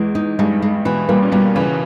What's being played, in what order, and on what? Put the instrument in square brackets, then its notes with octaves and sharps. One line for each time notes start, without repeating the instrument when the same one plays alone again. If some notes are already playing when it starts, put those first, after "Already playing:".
Already playing: [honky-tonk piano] E2 E3 [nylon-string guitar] G#3
[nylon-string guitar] D#4
[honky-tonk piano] G2 G3 [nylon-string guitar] G#3
[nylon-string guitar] G#3
[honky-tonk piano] B2 B3 [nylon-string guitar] E3
[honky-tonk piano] A#2 A#3 [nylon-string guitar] G3
[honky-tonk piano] C#4
[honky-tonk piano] B2 B3 [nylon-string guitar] G3
[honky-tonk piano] C#3 C#4 [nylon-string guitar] E3